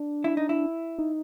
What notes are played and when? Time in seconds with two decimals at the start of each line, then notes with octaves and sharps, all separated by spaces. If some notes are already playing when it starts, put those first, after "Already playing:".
Already playing: D4
0.24 E4
0.37 D#4
0.49 E4
0.98 D#4